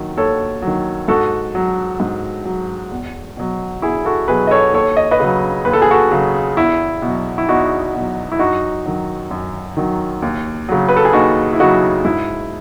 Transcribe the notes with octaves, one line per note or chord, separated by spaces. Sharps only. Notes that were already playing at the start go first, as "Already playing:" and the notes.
Already playing: D#2 D#3 F#3
D#2 A4 C#5
D#3 F#3
G#2 F#4 A4
F#3
G#2
F#3
E2
B2 F#3
E2 E4 G#4
F#4 A4
B2 F#3 G#4 B4
D#5
A4 C#5
D#2 A4 C#5
D#5
B4 D#5
C#3 F#3
D#2 B4
A4
G#4
F#4 A4
C#3 F#3
E2 E4
B2 F#3
E4
E2 D#4 F#4
B2 F#3
E4
F#2 D#4 F#4
D#3 F#3
F#2
D#3 F#3
D#2
C#3 F#3
B4
A4
G#4
D#2 D#4 F#4
E4
C#3 F#3 D#4 F#4
G#2 E4